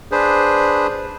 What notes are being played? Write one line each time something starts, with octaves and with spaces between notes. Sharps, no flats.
D4 G#4 B4 C5